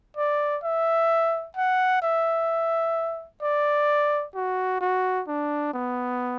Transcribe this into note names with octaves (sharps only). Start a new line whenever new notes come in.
D5
E5
F#5
E5
D5
F#4
F#4
D4
B3